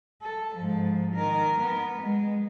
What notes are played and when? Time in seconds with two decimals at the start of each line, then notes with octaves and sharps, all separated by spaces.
0.22 A4
0.55 G#2 F3
1.15 D#3 A#4
1.60 B3
2.02 G#3